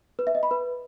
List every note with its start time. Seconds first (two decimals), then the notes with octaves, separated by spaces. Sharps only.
0.19 B4
0.27 E5
0.35 D#5
0.43 B5
0.51 B4